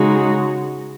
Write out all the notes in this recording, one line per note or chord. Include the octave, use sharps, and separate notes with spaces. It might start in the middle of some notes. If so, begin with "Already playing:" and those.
Already playing: C#3 G#3 D#4 F#4